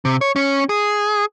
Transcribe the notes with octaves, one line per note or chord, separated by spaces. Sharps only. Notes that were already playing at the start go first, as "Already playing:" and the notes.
C3
C#5
C#4
G#4